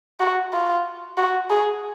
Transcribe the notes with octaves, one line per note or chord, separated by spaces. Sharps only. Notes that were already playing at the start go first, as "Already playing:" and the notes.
F#4
F4
F#4
G#4